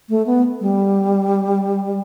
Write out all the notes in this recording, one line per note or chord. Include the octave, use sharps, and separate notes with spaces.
A3
B3
G3